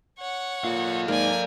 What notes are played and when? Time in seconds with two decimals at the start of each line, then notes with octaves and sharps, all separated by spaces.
0.19 C#5 F#5
0.64 A#2 A4 F5
1.08 G#2 A#3 D5 G#5